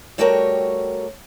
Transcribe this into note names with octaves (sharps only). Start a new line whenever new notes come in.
G3 A3 F#4 G4 A#4 C#5